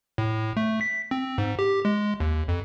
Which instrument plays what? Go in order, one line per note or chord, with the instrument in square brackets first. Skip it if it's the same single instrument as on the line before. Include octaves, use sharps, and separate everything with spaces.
[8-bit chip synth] A2
A3
B6
C4
G#2
G4
G#3
D#2
F2